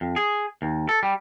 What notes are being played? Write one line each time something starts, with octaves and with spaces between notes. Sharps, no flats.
F2
G#4
D#2
A4
G3